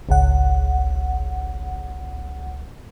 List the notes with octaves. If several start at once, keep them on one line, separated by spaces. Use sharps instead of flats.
G#1 C#2 F#5